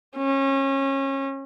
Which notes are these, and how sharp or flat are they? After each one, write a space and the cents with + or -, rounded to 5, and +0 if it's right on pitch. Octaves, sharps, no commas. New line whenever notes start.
C#4 -30